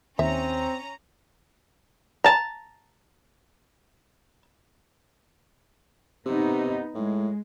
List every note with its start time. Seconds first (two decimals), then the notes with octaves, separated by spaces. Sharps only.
0.19 D#2 C4 C#4 E5 A#5
2.24 A5 A#5
6.26 C3 B3 D#4
6.95 A2 G#3